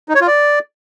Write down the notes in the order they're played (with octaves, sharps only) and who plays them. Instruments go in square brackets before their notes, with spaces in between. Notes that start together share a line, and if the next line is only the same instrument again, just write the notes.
[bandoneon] D#4
C#5
F4
D5